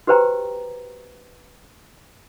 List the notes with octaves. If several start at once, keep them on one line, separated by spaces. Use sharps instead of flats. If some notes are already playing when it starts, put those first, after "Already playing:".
F#4 G4 B4 C5 G5 A#5